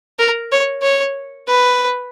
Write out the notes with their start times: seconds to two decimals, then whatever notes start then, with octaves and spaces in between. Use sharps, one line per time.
0.19 A#4
0.52 C#5
0.82 C#5
1.47 B4